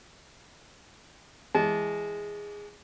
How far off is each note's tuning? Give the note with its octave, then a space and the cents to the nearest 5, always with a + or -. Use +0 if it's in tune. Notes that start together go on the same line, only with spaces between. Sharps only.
E3 +0 G#3 -10 A5 -35